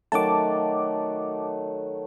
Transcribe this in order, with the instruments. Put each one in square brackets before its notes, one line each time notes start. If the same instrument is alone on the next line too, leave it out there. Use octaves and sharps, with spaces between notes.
[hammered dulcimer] D#3 F#3 A3 [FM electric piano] A5 D6